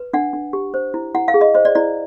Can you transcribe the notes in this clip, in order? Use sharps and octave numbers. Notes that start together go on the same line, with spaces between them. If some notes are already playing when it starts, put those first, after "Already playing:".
Already playing: B4
D4 F#5
D4
G4
C5
E4
E4 F#5
F5
G#4
D#5
C5 D#5
D5
E4 D5